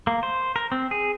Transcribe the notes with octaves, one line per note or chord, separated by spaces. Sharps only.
A#3
C5
A#4
C4
G#4